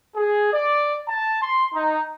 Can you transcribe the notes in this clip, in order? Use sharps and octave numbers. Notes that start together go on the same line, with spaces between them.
G#4
D5
A5
C6
D#4